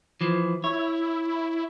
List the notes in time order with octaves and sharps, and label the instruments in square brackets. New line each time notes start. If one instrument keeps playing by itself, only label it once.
[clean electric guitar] E3 F3
[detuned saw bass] E4 [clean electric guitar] C#5